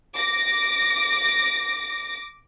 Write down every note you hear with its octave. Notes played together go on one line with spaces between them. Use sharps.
D6 A#6